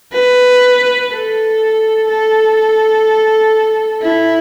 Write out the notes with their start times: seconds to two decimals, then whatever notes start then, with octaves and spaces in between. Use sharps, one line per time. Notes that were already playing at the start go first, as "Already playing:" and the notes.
0.13 B4
1.10 A4
2.08 A4
4.02 E4